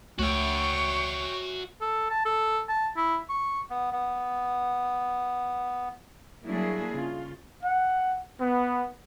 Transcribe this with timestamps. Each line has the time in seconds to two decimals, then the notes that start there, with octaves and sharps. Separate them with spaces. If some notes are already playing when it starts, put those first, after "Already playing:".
0.19 C#2 A3 F#4 C#5 E5 G5 C#6
1.81 A4
2.10 A5
2.26 A4
2.69 A5
2.97 E4
3.30 C#6
3.70 B3
3.92 B3
6.44 F#3 G3 A#3 D4 E4 G#4
6.93 C#3 F4
7.63 F#5
8.41 B3